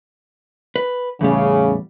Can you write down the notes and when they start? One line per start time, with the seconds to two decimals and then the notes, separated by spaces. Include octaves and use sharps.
0.76 B4
1.21 E2 A2 C#3 G3